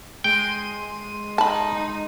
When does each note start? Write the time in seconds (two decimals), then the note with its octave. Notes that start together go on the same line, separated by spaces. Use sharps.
0.24 G#3 G5 C6 D#7
1.38 D#4 A5 B5